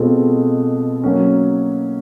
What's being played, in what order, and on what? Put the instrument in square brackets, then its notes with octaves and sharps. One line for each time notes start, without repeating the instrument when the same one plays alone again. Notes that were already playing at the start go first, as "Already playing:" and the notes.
Already playing: [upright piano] B2 G#3 C4 F4 A4
F#3 A#3 C#4